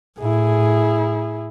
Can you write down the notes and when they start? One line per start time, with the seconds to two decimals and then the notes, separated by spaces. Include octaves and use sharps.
0.19 A2 E4 G#4